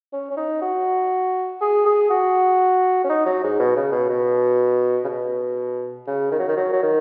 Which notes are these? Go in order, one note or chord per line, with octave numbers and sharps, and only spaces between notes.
C#4
C#4
D#4
F#4
G#4
G#4
F#4
C#4
D#4
F#3
G#2
B2
C#3
B2
B2
C#3
B2
C#3
D#3
F#3
D#3
F#3
F#3
D#3